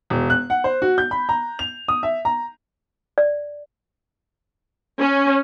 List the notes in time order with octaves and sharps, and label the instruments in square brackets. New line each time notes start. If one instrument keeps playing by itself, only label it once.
[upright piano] E1
F#6
F#5
C5
F#4
G6
B5
A#5
F7
D#6
E5
A#5
[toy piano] D5
[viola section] C#4